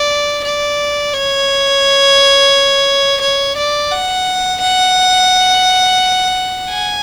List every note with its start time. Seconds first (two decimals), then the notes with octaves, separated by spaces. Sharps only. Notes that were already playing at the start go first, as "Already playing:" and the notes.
Already playing: D5
0.45 D5
1.14 C#5
3.22 C#5
3.57 D5
3.92 F#5
4.61 F#5
6.69 G#5